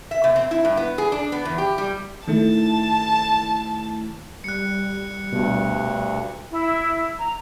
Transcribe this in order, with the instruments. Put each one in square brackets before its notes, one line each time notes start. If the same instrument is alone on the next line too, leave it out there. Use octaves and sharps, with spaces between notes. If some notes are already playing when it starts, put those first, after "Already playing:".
[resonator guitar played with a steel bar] E5
B2
C4
E4
G2
B3
G#4
D4
B3
E2
G4
G3
[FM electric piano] D#3 A3 E4 [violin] A5
[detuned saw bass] G3 [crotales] F#6 C#7
[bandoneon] D2 G2 [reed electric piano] B2
[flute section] E4
A#5